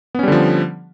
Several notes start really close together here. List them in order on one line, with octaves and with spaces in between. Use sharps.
B3 C#4 G3 D3 F3